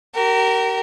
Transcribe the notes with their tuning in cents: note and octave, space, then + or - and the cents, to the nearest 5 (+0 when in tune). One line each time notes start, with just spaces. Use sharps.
G4 -40 A#4 -10